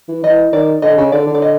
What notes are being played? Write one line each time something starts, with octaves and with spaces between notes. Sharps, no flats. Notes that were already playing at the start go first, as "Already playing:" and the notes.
E3
E3 D#5
D#3 D5
D3 D#5
C#3
D3 D5
D3
D5
D#5